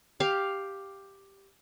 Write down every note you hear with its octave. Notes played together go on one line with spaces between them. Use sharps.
G4 F5